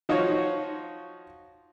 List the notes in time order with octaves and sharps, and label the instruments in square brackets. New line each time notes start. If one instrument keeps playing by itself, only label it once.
[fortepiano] F3 D#4 F4 F#4 C#5